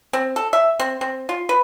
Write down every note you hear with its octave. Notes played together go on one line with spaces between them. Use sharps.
C4
A4
E5
C4
C4
F4
B4